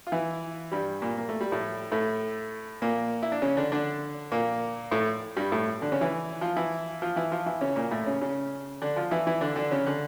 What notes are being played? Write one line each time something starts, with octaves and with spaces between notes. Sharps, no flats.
F4
E3 E4
G2 G3
A#2 A#3
A#3
A3
G3
A2 A3
A2 A3
A#2 A#3
E4
D4
C#3 C#4
D3 D4
D3 D4
A#2 A#3
A2 A3
G2 G3
A2 A3
D3 D4
C#3 C#4
E3 E4
F3 F4
E3 E4
F3 F4
E3 E4
F3 F4
E3 E4
C#3 C#4
A#2 A#3
A2 A3
C#3 C#4
C#3 C#4
D3 D4
F3 F4
E3 E4
E3 E4
D3 D4
D3 D4
C#3 C#4
D3